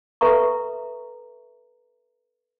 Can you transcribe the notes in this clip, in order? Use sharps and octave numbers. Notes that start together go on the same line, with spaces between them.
A4 B4 E5 A#5 C#6